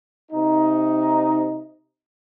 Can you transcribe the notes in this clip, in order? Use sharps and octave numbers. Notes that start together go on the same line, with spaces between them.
C3 D#4